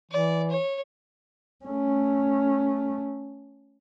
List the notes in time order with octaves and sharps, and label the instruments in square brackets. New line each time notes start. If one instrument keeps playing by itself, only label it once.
[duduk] E3 [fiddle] D5
[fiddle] C#5
[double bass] A3 C#4